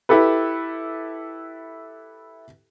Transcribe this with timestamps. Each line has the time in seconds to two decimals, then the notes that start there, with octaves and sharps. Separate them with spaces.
0.09 E4 G4 A4 B4